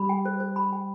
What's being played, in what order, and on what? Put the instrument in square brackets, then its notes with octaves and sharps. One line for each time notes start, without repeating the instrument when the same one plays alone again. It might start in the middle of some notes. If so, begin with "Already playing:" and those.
Already playing: [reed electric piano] G3 [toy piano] B5
[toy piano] G5
C5
C5
B5
G5